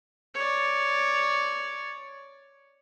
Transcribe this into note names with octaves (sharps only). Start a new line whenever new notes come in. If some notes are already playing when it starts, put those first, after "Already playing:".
C#5 D5